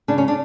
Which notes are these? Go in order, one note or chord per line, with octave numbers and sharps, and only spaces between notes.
C#3 D4
C#4
D4